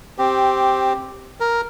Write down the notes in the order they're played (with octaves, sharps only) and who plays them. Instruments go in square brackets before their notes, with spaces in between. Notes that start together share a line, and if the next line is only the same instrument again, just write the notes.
[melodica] C4 G4
A#4